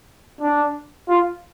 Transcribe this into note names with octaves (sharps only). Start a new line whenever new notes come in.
D4
F4